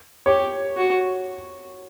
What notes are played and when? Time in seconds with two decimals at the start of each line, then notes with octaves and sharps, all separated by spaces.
0.26 G4 C#5
0.77 F#4